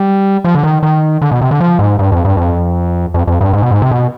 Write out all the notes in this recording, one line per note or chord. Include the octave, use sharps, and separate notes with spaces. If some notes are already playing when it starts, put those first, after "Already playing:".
Already playing: G3
F3
D3
D#3
D#3
D3
B2
C3
D3
F3
G#2
G2
F2
G2
F2
F2
F2
G2
G#2
B2
G#2
C3
B2